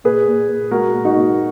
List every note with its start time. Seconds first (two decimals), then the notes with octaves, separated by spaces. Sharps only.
0.04 A#2 G#4 B4
0.27 A#2
0.49 A#2
0.71 G#3 F#4 A#4
0.93 A#2
1.05 D#4 F#4
1.15 A#2